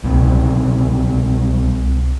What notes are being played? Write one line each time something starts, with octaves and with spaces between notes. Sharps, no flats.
C2 B2 C4